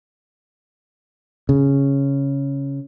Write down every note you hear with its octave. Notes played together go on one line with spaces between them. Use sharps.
C#3